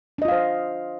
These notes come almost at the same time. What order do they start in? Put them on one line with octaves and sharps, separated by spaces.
D4 D#5 F4 F5 C5